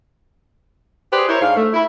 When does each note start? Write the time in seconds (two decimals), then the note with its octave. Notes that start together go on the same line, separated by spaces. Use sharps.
1.13 G4 G#4 B4 C5 D5
1.29 E4 A#4 C5 C#5
1.42 G#2 D4 F5
1.56 A3
1.74 E4